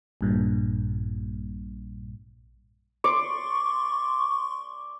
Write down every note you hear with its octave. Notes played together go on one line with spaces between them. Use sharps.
A#1 G2 A#2
D5 C6 C#6